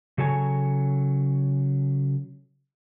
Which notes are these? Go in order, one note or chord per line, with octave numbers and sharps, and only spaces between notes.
C#3 F#3 A4 C#5 G#5 A#5